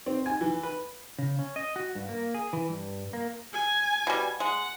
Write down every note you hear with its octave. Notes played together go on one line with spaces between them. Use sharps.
C4
G#5
E3
B4
C#3
C#4
D#5
F#4
G2
A#3
G#4
E3
G2
A#3
G#5
B2 G3
G#3 F#5